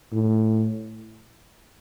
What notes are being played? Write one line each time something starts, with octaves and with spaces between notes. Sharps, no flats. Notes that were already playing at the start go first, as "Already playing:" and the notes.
A2